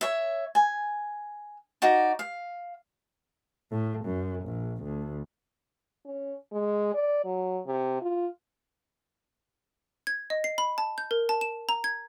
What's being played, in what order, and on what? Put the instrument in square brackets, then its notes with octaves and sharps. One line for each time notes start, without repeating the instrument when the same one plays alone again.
[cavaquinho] C#5 E5
G#5
D#4 F#4 D5
F5
[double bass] A2
F#2
A#1
D2
[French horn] C#4
G#3
D5
F#3
C3
F4
[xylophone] G#6
D#5
C7
B5
A5
G6
A#4
A5
E7
A#5
G#6